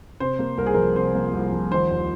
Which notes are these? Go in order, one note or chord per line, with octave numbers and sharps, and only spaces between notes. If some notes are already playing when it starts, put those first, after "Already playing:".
C3 C5
A#3
C2 A#4
G#4
F3 A#4
C3 C5
A#3
C2
F3
D#3 C5
D#2